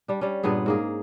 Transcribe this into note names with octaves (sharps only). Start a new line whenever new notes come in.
G3 D4
G3 C#4
G2 A#2 B3 G#4
G#2 A#3 G#4